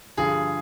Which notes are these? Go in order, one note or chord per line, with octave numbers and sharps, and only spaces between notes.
G2 D3 F3 G#4